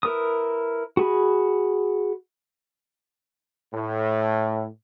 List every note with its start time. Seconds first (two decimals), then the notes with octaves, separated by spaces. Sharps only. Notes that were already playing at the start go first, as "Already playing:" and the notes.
0.03 E4 A#4 B4 D#6
0.97 F#4 G#4 B5
3.73 A2